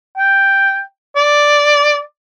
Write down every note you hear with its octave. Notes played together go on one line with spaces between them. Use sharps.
G5
D5